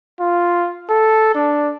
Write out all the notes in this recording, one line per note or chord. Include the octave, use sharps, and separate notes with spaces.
F4
A4
D4